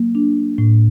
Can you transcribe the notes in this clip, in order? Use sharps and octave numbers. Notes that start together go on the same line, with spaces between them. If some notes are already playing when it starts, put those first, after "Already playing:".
Already playing: F#3 A#3
D4
A2